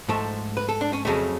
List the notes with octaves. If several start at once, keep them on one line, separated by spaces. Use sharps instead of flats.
G#2 F3 A3 A4
B4
A4
D4
C#4
F2 C#3 F#3 A3 C#4